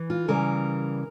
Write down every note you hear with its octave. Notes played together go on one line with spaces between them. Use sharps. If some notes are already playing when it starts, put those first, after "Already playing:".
Already playing: E3
F4
C#3 E3 G3 A#4